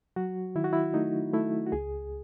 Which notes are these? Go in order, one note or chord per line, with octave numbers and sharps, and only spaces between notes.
F#3 F#4
D#3 E4
F#4
E4
A3 D#4
A3 E4
F#4
C#2 G#4